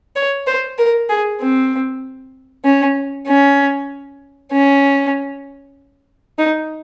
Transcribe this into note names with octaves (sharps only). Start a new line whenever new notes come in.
C#5
C5
A#4
G#4
C4
C#4
C#4
C#4
D#4